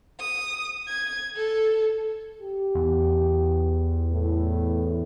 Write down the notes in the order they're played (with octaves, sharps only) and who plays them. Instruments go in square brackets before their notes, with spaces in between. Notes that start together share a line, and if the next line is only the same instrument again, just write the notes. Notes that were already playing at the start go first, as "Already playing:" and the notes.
[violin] D#6
G#6
A4
[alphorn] G4
[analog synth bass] E2
[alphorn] A2